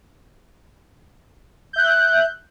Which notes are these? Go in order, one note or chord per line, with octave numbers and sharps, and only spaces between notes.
E5 F#6 G6